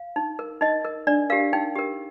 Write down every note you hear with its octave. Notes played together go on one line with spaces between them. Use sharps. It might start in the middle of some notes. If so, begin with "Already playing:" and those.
Already playing: F5
D#4
A#4
D#4 D#5
A#4
D4 D5
G4 A#4 F5
D#4 G5
G4 A#4